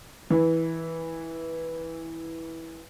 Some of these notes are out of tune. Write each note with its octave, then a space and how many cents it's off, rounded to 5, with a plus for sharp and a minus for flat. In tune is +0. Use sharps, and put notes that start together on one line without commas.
E3 -10